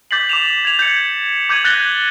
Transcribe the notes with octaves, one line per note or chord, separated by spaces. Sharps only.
D6 G6 A6 B6 C7 F#7
D6 E7 F7
G#6 F7
G6 C#7
D6 G6 G#6 D#7 F#7
F#6 G6 A6 A#6 G7